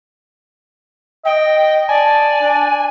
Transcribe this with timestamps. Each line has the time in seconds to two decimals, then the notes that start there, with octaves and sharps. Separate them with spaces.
1.25 D#5 G5
1.89 D5 G#5 A5
2.41 D4